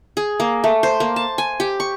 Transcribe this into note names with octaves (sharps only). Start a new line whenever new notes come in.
G#4
A#3
A3
C5
A#3
A5
G#5
G4
C#6